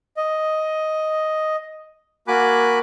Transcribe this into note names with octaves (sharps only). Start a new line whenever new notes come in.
D#5
A#3 F#4 G#5 B5 D6 F#6